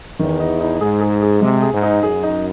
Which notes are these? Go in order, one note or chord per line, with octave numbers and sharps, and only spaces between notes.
E2 D#3
D#4
D#4
G#2 G#4
G#4
G#4
C3 G#3
G#4
G#2
D#4
F#2 G#4
D#4